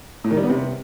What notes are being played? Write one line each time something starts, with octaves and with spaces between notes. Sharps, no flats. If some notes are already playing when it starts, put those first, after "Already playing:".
A2
D#3
G3
B3
C3